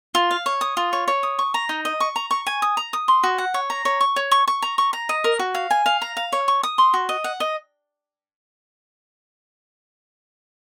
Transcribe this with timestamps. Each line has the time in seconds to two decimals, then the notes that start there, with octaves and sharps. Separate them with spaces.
0.15 F4
0.31 F5
0.46 C#5
0.61 D#6
0.77 F4
0.93 C#5
1.08 C#5
1.23 D#6
1.39 C#6
1.54 A#5
1.69 D#4
1.85 D#5
2.00 C#6
2.16 A#5
2.31 C#6
2.47 G#5
2.62 D#6
2.77 A#5
2.93 D#6
3.08 C6
3.24 F#4
3.38 F#5
3.54 C#5
3.70 A#5
3.85 C#5
4.01 C#6
4.16 C#5
4.31 C#6
4.48 C#6
4.62 A#5
4.78 C#6
4.93 A#5
5.09 D#5
5.24 A#4
5.39 F#4
5.55 F5
5.71 G#5
5.86 F5
6.02 A#5
6.17 F5
6.33 C#5
6.48 C#6
6.63 D#6
6.78 C6
6.94 F#4
7.09 D#5
7.24 F#5
7.40 D#5